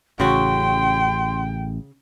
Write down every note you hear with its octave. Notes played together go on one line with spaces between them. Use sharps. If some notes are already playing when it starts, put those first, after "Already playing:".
A1 C#3 F#4 G5 C6